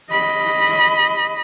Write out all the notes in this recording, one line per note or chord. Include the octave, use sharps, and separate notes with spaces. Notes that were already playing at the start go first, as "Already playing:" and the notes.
D#5 B5